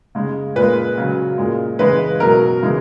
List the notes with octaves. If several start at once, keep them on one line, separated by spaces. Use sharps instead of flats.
C#3 G#3
A#2 G#3 B4
C#3 F#3
A#2 G#3
C#3 E3 G#3 B4
B2 F#3 A#4
C#3 E3 G#3